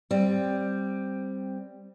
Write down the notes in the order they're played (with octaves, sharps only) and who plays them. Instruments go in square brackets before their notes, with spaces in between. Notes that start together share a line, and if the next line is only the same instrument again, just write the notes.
[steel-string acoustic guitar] G3 C4